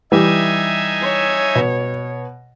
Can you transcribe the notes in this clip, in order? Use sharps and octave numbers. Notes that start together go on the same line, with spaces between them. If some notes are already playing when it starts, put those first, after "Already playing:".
E3 G3 D#4 E5 G#5
C#5
B2